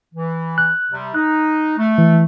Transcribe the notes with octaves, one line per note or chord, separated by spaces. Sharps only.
E3
F#6
C3 G3
D#4 F#6
A3
E3